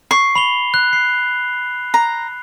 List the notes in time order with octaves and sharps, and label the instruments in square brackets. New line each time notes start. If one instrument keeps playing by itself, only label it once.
[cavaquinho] C#6 [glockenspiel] C7
[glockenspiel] B5 F7 G7
F#6
C7
[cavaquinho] A#5